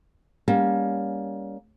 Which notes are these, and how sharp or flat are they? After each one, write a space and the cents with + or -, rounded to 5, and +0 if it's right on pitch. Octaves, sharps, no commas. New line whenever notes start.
G3 +25 A#3 +30 C#4 +25